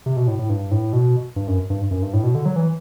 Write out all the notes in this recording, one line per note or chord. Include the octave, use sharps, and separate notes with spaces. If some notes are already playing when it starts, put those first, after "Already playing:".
C3
B2
A2
A2
G2
A2
B2
G2
F#2
G2
F#2
G2
A2
B2
D3
F#3
E3